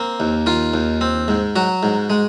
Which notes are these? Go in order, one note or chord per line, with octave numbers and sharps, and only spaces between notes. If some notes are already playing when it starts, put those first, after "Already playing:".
Already playing: A#3 C4
D#2
D#3 F4
D#2
C4
G#2
F#3 F#4
G#2
G#3